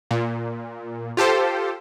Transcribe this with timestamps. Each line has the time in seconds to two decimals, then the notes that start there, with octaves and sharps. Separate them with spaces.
0.11 A#2
1.17 F4 G4 A4 C5